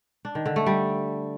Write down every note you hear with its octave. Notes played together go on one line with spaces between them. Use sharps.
D4
D#3
D3
A3
G3